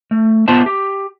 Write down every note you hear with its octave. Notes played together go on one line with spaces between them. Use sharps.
A3
B3 F4 C5 E5 A5
G4